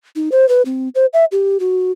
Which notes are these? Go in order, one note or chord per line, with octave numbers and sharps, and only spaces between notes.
D#4
C5
B4
C4
C5
E5
G4
F#4